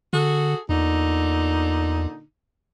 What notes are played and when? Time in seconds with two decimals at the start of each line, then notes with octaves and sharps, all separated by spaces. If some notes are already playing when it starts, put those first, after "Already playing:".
0.13 D3 F#4 G#4 A4
0.69 E2 A#2 D3 D#4